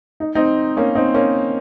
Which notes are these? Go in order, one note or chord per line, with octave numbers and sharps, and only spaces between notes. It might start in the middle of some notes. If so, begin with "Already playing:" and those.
D#4
C4 D#4
A#3 C#4
C4 D#4
A#3 C#4